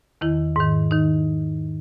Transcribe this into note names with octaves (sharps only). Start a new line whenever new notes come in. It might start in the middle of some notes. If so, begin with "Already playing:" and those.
E2 D#3 E4
G#2 D#3
D#3 D#4